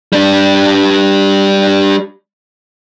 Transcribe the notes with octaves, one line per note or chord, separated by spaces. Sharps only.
G3 D4